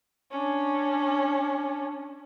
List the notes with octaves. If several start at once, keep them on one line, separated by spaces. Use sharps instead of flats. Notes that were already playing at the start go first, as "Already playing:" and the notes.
C#4 D4